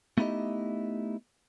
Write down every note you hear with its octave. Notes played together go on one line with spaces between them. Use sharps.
A3 B3 D#4 E4 G4 D#5